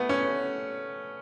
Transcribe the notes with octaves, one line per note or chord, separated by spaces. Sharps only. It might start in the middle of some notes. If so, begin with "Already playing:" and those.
Already playing: A3 B3
C#4